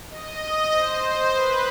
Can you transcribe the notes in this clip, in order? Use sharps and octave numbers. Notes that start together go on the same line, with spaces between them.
D#5
C5
B4